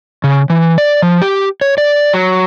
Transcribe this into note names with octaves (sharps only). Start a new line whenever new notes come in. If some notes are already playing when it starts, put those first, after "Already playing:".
C#3
E3
D5
F3
G4
C#5
D5
F#3